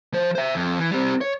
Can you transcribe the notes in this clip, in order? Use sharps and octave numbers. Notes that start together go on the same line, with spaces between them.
F3 C5
C5 E5
F2
E3
G3 C4
C#5